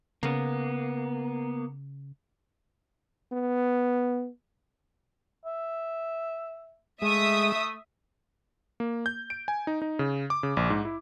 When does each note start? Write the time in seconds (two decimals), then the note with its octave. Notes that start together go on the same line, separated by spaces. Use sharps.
0.23 C#3 A#3 B3
3.32 B3
5.45 E5
7.02 G#3 A3 E5 D#6
8.80 A#3
9.06 G6
9.30 D7
9.48 G#5
9.67 D#4
9.82 D#4
9.99 C#3
10.30 D6
10.43 C#3
10.57 A#1
10.70 G#2
10.85 E4